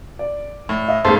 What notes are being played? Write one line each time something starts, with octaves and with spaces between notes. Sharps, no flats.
D5
A2
D#5 E5
G#1 C#3 G#3 A3 B3 A4 C5